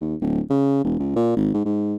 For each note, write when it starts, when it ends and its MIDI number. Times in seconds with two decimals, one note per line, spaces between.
0.01 0.15 39
0.21 0.40 26
0.50 0.84 49
0.84 0.98 28
0.99 1.13 37
1.16 1.33 46
1.36 1.51 32
1.54 1.64 44
1.65 1.96 44